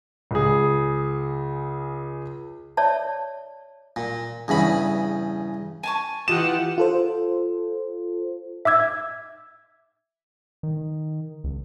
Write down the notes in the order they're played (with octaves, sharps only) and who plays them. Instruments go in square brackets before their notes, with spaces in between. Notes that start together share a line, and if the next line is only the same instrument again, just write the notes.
[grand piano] C#2 G#4
[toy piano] C#5 D5 E5 A5
[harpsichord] A#2
E2 G2 C#3 B5
[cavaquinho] G#5 A5 C#6
[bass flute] E3 [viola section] F4 G4 F#5 [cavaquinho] D#5 [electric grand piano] E7
[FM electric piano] F4 A4 C5
[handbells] E5 D6 E6 G#6
[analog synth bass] D#3
C#2